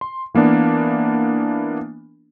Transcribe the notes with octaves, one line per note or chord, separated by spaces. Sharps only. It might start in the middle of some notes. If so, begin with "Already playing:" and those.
C6
E3 A#3 B3 D4